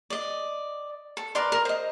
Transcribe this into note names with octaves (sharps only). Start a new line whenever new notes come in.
D5 D#5
A4
A#4 B4 D5 C6
A#4
C5 D#5